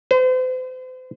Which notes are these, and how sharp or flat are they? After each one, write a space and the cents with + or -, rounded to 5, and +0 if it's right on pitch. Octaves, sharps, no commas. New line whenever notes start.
C5 -40